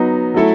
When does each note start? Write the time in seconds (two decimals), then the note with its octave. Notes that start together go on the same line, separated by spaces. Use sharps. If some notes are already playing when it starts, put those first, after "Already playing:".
Already playing: F#3 B3 D#4
0.34 F#3 A3 E4 A4